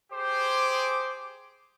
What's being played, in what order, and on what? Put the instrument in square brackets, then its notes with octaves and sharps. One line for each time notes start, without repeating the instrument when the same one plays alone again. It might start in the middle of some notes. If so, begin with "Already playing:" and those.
[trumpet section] G4 G#4 C5 [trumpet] D6